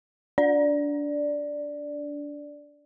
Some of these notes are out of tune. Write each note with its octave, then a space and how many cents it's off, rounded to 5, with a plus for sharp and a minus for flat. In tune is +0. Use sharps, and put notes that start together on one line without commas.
D4 -20 D5 +0